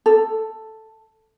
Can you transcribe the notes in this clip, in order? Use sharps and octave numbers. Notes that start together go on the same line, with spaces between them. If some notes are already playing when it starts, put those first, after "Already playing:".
A4